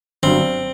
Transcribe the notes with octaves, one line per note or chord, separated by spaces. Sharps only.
G1 G2 F#3 C4